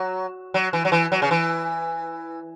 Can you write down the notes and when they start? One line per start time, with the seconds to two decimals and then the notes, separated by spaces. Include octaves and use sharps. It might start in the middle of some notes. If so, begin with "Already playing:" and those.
Already playing: F#3
0.54 F#3
0.73 E3
0.85 F#3
0.92 E3
1.12 F#3
1.22 C#3
1.31 E3